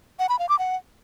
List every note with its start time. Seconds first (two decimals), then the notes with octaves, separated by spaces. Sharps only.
0.19 F#5
0.29 B5
0.39 F5
0.49 D6
0.59 F#5